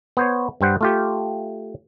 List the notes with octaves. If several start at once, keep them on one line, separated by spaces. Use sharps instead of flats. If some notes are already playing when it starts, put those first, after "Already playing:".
B3 C5 C#5
G2 G3 C5 F#5
A3 F4 G4